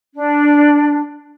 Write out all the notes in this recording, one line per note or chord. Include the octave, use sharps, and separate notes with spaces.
D4